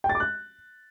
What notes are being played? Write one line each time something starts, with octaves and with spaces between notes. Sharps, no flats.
G5
A6
D6
F#6